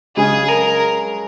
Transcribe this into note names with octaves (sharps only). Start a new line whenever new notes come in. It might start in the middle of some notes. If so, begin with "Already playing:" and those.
C#3 G#3 C#4 G#4
A#4